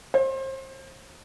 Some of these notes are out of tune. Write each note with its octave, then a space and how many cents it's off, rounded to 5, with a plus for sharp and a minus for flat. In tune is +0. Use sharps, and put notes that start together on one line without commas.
C5 +30